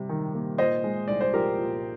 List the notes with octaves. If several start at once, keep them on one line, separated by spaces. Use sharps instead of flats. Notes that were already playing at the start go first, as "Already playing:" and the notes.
Already playing: C3 G3
D#3
A#3
A#2 C5 D#5
G#3
C2 D5
C5
F3 G4 A#4
A#2